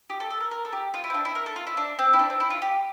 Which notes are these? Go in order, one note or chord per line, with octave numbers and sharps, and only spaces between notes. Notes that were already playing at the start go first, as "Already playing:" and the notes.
G4
A4
A4
A#4
A#4
A4
G4
F4
E4
C4
D4
E4
A#4
A4
F4
E4
D4
C4
E4
D4
C4
E4
F4
G4